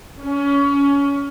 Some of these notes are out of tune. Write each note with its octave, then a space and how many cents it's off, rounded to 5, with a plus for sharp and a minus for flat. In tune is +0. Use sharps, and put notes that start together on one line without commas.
C#4 +25